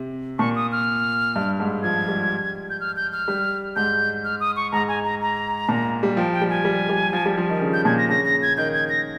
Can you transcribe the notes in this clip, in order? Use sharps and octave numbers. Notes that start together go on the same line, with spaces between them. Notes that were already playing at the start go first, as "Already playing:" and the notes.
Already playing: C3
A#2 C#6
D#6
F6
G2
G#2
F3 G#6
G3
G6
F6
G6
F6
G3
G#2 G6
F6
D#6
C#6
G#2 A#5
G#5
A#5
A#5
A#2
G3
F3 G5
G5
G3
G#5
G3
G3
F3
G3
F3
D#3
C#3
G6
A#2 G#6
A#6
C#3 A#6
A#6
G#6
D#3 G6
G#6
A#6